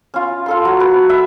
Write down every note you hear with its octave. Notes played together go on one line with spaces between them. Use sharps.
C#4 F4
F4 A4 C6
F#3
B4
E5